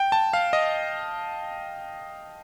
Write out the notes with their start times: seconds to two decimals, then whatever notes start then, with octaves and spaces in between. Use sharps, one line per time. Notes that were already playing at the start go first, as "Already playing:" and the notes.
Already playing: G5
0.12 A5
0.33 F5
0.53 D#5